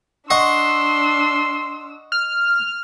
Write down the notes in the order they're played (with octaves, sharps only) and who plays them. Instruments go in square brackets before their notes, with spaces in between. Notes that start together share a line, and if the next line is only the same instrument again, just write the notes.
[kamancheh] D4 E6 [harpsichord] D#5 F#5 C#6 [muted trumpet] C6
[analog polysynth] F6